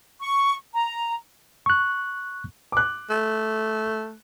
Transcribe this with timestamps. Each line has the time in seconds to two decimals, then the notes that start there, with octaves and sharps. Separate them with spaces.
0.21 C#6
0.74 A#5
1.66 C#6 F#6
2.72 D6 F#6
3.10 A3